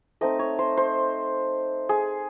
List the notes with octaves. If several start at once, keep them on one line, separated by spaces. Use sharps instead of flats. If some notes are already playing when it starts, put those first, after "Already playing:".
A3 C4 D#4 D#5
C#5
C5
C5
G#4